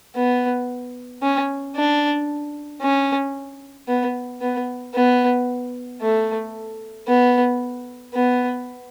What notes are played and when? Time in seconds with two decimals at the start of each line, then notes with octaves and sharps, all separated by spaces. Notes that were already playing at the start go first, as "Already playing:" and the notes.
0.16 B3
1.23 C#4
1.76 D4
2.82 C#4
3.88 B3
4.41 B3
4.95 B3
6.01 A3
7.08 B3
8.14 B3